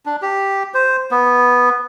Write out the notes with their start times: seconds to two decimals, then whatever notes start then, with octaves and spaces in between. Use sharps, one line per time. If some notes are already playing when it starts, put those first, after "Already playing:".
0.06 D4
0.22 G4
0.74 C5
1.11 B3